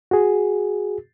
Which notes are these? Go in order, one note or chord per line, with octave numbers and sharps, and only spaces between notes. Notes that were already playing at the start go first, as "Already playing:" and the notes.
F#4 G#4